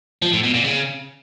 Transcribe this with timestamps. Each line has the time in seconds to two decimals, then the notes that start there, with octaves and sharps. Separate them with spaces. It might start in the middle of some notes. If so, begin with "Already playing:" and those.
0.22 F3
0.33 A2
0.43 B2
0.54 A#2
0.64 C#3